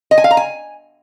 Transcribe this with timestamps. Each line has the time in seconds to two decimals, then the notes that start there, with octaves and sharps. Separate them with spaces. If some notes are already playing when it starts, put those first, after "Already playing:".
0.11 D#5
0.18 G#5
0.24 F5
0.31 A#5
0.37 G#5